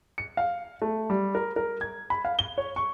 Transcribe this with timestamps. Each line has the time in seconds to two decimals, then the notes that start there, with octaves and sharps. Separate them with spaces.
0.18 C#7
0.37 F5
0.82 A3
1.10 G3
1.35 A#4
1.56 A#4
1.81 G#6
2.10 B5
2.25 F5
2.39 G7
2.58 C#5
2.76 C#6